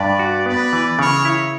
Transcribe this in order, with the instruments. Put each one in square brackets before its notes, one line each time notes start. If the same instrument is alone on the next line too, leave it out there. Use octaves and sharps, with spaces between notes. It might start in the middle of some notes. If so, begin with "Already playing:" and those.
Already playing: [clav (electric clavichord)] G2 [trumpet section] B4 D5
[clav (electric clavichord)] F#4
[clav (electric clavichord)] B3 [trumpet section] B4 D5
[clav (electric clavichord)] E3
[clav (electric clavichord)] C#3 [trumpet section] A#4 C#5
[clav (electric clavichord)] E4